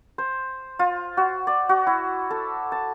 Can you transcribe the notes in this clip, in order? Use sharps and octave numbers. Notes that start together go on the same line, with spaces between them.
C5
F4
F#4
D5
F#4
E4
A4
A5